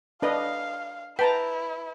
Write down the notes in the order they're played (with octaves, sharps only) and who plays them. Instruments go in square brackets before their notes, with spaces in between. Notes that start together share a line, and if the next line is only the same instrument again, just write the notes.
[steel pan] D4 B4 D#5 [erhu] F5
[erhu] E4 [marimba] B4 [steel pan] G5 A5 A#5